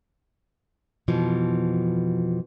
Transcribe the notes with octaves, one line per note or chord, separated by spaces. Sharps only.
F2 B2 E3 F3